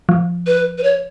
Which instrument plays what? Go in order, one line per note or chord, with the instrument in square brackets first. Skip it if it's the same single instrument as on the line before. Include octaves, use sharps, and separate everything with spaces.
[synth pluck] F3
[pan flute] B4
B4
C#5